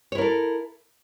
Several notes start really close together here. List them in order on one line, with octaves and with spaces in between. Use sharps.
C#5 E4 A#4 A4